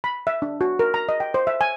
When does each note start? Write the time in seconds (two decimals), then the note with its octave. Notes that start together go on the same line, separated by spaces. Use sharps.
0.04 B5
0.27 E5
0.42 D4
0.61 F#4
0.79 A#4
0.94 A#5
1.09 D#5
1.20 G5
1.34 C5
1.47 E5
1.61 G#5